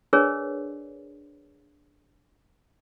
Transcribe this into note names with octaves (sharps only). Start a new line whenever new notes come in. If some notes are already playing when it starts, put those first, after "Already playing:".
D4 G#4 A#4 B4 C#5 D5